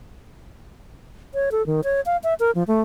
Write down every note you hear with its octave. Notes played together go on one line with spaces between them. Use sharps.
C#5
A4
D#3
C#5
F5
E5
A#4
F3
A3